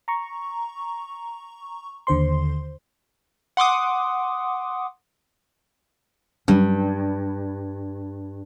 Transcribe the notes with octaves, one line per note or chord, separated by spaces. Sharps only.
A#5 C#6
D#2 D3 C5 C6
F#5 C6 D6 D#6
G2 F#3 G3 C#4